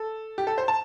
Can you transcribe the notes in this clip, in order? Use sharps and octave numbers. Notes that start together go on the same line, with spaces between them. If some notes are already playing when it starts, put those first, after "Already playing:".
Already playing: A4
G4
A4
C5
A5